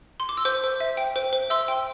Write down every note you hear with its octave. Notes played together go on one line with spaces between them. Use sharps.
C6
D6
E6
C5 D6 G6
C5
E5
G5
C5
C5
E5 C6 E6
G5